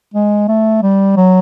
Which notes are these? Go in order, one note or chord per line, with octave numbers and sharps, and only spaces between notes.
G#3
A3
G3
F#3